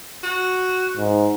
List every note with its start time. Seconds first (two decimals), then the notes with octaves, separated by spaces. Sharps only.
0.23 F#4
0.97 G#2